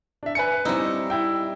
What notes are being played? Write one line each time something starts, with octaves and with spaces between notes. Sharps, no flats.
D4 E5
B4 G#5 C#7
G3 C4 D#4 E4
E4 G5